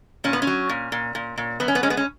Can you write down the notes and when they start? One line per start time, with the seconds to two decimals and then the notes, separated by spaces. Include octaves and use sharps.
0.24 A#2 C#4
0.33 B3
0.42 C#4
0.47 F#3
0.69 A#2
0.92 A#2
1.15 A#2
1.38 A#2
1.60 F#2 B3
1.68 C#4
1.75 B3
1.83 G#3 C#4
1.90 B3
1.97 C#4